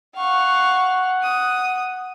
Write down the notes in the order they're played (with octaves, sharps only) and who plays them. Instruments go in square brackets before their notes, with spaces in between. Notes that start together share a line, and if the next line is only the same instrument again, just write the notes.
[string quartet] F5 C#6 [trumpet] F#5
[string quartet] D#6